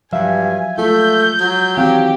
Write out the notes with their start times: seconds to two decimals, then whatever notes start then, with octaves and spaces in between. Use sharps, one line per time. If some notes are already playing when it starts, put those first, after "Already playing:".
0.13 G2 F3 F#3 E5 F5 G#5
0.78 G#3 A3 F4 G6
1.40 F#3
1.77 D#3 E3 C4 F#4 G4 F5 G5